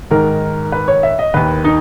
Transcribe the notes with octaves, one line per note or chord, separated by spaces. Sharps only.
G#2 D#3 A#4
B4
C#5
E5
D#5
D#2 D#3 B4
D#4